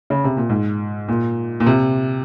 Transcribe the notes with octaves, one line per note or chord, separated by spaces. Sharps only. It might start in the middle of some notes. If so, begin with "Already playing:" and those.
C#3
C3
A#2
G#2
A#2
A#2
C3